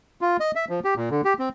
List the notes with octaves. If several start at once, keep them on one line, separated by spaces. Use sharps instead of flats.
F4
D#5
E5
F3
G4
A#2
D3
G4
C4